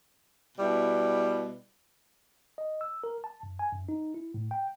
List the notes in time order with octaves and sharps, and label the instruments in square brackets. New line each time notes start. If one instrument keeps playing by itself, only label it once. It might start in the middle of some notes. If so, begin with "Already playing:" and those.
[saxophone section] B2 G3 E4
[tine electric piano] D#5
E6
A#4
A5
F#2
G#5
F#2
D#4
E4
A2
G5